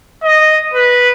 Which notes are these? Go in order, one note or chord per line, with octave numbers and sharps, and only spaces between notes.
D#5
B4